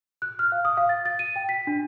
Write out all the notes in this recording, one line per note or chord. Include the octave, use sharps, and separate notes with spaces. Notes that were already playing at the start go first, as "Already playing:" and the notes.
F#6
F6
F5
D#6
F5
A6
A6
D#7
G5
B6
D4